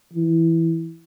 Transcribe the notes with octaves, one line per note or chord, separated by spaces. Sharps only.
E3